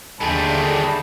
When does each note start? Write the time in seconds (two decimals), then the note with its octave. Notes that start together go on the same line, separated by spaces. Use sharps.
0.21 D#2 D3 A3 G#4 G5 A5 B5